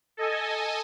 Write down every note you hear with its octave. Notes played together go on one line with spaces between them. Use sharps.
A4 D#5 G#5